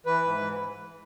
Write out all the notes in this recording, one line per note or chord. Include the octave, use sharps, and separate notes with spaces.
E3 B4
G#2
E3